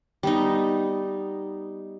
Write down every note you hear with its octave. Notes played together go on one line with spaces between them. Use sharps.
G3 B3 D#4